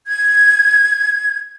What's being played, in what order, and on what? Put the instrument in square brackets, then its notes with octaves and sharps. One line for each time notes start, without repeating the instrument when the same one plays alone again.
[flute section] G#6